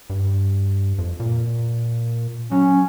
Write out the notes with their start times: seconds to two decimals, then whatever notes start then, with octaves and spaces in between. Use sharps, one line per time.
0.10 G2
0.98 F2
1.20 A#2
2.52 F#3 C#4